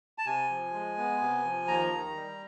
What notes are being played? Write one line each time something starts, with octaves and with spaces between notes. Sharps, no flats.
A5
C3 G#5
F3
G#3
B3
C3
F3
D#2 A#5
D#3
G3